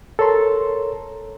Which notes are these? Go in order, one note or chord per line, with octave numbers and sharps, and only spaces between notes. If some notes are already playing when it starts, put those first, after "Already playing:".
A4 A#4 C#5 A#5 C6